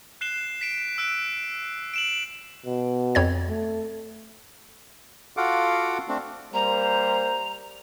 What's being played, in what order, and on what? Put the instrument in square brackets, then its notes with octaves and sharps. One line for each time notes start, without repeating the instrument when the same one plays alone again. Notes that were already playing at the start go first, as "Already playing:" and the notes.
[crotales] F#6 C7 E7 G7
B6 D7 E7
E6 F#6 D7
D7 E7 F#7
[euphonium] B2
[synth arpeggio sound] F2 C#5 G#6
[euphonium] A3
[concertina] F4 F#4 A4 F5 F#5 D6
A3 C4 D4
[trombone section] G3 A#3 C5 [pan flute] A#5